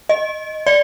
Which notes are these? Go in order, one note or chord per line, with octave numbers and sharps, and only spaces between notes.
D#5
D5